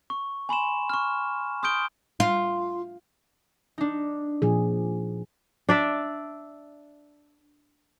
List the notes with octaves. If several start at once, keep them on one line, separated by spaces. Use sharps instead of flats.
C#6
G#5 B5 C6 E7
C#6 F6
C6 D#6 F6 G6 D7 G7
F4
D4 D#4
A#2 F3 G#4
D4 D5 E5